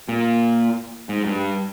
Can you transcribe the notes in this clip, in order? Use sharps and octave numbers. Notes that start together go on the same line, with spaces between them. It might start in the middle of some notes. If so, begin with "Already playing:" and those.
A#2
G#2
G2